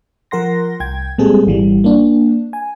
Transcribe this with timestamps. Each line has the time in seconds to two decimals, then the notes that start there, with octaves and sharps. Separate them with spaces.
0.31 F3 A#4 F#5 C6 A#6
0.80 C2 G5 G#6
1.18 A#2 G3 G#3 C4 G#4 A4
1.47 G#1 E3 G3
1.84 A#3 D4
2.53 G#5